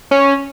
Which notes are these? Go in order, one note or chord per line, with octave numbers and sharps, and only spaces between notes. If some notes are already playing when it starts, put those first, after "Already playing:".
C#4